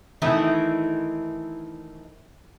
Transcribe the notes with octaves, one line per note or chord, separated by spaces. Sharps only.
D#3 E3 A3 C4 D#4 E4